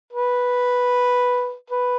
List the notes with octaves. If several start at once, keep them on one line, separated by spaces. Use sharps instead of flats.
B4
B4